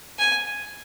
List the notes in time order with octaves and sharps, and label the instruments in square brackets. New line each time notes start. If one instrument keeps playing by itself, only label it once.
[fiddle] G#5